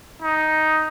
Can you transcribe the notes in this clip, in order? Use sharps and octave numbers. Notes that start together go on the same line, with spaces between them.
D#4